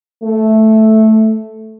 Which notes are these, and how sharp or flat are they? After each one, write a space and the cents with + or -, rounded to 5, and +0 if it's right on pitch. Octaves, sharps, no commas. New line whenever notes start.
A3 -5